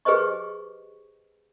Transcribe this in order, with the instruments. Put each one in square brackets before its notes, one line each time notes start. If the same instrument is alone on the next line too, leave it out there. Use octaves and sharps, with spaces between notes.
[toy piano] G4 G#4 B4 C5 D#5 C#6